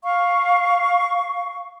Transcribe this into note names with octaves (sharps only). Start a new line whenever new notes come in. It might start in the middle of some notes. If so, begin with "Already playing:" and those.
F5 C#6